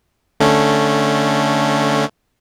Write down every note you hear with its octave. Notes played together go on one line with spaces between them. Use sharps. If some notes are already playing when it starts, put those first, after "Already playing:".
D3 A3 C#4